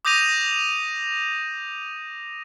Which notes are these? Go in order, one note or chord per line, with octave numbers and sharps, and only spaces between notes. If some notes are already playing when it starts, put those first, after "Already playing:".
D6 D#6 G6 A#6 D#7 F7